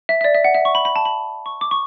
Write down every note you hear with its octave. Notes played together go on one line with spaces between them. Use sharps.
E5
E5
D5
E5
F#5
E5
C#6
B5
B5
A5
B5
C#6
D6
C#6